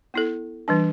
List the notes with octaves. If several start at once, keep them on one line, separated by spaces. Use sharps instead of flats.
B3 E4 A4
E3 G3 D4